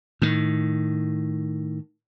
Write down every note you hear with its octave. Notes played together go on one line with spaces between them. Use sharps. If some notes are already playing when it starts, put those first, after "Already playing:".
A2 D#3